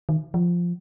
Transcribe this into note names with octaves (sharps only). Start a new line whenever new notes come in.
D#3
F3